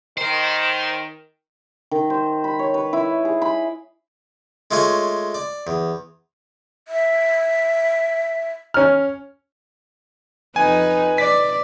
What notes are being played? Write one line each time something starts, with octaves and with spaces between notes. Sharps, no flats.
D#3 C5
D#3
C5
B5
C#5
B4
E4
G#4
B5
G#3 A3 F4 C#5 G#5
D5
E2
E5
C#4 F6
F2 D#4 B4 G#5
D5 B6